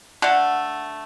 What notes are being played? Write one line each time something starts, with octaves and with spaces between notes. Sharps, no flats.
D3 A3 F#5